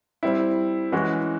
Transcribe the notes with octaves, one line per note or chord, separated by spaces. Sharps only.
G3 C4 E4
E3 G#3 C#4 F#4